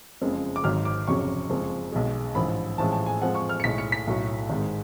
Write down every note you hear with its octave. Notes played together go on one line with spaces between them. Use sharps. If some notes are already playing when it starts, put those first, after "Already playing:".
F#1 F2 C#3 F3 G#3
D6
G#1 G#2 F#3 F6
D6
F1 F2 C#3 F#3 C#6
F#1 F2 F3 G#3
B1 B2 G#3
A1 G#2 F3 B5
A1 A2 F3 G#3 A5
A5
G#5
F2 F3 G#3 F#5
C#6
F6
C#7
B1 A2 G#3 B6
C#7
B6
B1 A2 F#3
G#1 G#2 G#3